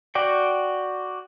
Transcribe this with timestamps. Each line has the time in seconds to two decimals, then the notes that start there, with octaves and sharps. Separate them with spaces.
0.15 F#4 D5 G5